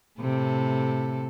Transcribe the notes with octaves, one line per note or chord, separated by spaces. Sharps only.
A2 C3 A4